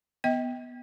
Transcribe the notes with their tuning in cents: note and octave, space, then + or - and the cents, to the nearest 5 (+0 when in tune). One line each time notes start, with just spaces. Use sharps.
B3 +0 D#5 +40 G5 +0